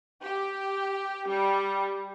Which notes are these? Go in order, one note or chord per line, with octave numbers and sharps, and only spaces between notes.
G4
G3